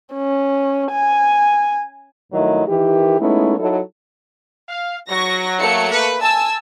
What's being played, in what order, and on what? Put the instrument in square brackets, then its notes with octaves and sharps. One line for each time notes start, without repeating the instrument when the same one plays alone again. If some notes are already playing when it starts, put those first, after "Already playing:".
[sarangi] C#4
G#5
[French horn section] G2 D#3 F#3 A3 E4 D#5
D#3 E3 G4
G#3 A3 B3 C#4 D#4 E4
F#3 D#4 E4 A4
[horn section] F5
[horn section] F#3 [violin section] C#6 A#6
[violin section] A3 A#3 C#7
[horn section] B4
[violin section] G#5 E6 [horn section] A5